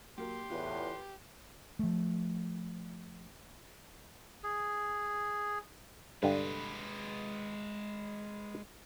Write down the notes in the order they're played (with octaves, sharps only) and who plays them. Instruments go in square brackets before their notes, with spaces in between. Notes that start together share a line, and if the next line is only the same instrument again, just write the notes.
[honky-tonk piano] F#3 A#3 [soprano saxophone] G4 [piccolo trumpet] C6
[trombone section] E2 A2 [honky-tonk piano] F4 B4
[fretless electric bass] F3 A3
[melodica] G#4
[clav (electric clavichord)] G2 D3 [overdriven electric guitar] G#3 B4